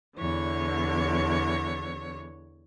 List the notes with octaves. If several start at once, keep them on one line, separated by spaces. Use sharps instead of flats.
E2 D3 C#5